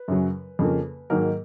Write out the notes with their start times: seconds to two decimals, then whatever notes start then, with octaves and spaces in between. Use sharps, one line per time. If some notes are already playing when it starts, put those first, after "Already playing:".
Already playing: B4
0.08 F#2 C#3 F#3
0.59 F2 C#3 F3 A#3
1.10 G#2 D#3 F#3 A#3 A#4